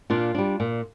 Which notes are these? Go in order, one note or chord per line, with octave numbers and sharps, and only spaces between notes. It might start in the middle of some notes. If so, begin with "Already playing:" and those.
A#2 D4 F4
G3 D4
A#2